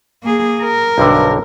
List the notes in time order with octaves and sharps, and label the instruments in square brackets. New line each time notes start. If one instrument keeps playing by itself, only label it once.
[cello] A#3 G#4
A#4
[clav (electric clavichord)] B1 G2 D3